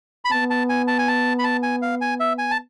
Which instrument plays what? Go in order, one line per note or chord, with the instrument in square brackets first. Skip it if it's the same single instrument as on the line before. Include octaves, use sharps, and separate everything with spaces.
[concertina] B5
[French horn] B3 [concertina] A5
[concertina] A5
G#5
A5
G#5
A5
B5
A5
G#5
F5
G#5
E5
G#5
A5